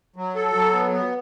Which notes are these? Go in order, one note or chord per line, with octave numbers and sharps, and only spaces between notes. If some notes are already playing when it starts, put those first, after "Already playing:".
F#3
A4
F#3
B3
B3